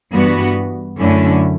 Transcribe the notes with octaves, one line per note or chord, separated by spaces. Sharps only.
G2 E3 B3 F#4
F#2 D3 A3 C#4 E4